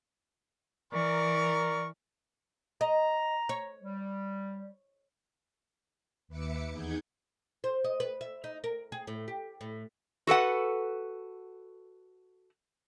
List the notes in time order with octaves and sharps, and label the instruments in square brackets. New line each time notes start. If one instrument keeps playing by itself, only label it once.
[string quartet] E3 [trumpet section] A#4 [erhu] D5 [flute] C#6
[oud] D#5 [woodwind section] A#5
[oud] C#5
[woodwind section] G3
[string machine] D#2 B4 E5 D6 C#7
E2 D#4 G#4 F#5 G6 G#6
[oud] C5
D#5
B4
E5
D#4
A#4
G#4
A2
G4
A2
[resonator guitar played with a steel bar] F#4 A4 B4 F#5